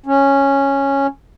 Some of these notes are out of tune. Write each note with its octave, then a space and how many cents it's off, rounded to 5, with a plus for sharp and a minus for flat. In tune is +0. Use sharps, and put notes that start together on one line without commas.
C#4 -5